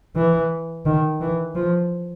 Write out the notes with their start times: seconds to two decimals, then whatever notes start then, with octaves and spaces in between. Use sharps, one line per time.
0.16 E3
0.86 D#3
1.21 E3
1.55 F3